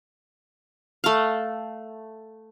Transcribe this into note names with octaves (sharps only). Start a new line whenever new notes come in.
A3 F5